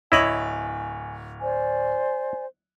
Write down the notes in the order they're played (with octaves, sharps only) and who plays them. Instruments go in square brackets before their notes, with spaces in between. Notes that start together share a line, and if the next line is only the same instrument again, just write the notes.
[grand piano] D1 C#5 F#7 [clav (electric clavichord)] E4 D#5 [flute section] G#5
[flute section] C5 D5 G#5